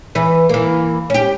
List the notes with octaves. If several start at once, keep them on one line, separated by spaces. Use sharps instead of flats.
E3 B4
E3 A#3
C#4 G4